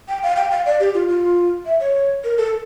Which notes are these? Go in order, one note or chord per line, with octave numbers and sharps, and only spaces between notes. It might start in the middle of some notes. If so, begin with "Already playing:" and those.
G5
F5
G5
F5
D5
G4
F4
F4
E5
C#5
A#4
A4